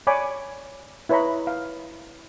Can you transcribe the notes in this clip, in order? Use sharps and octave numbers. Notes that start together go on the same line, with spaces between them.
C#5 D5 G#5 B5 C#6 D6
E4 B4 C#5 D#5 A#5 B5
F5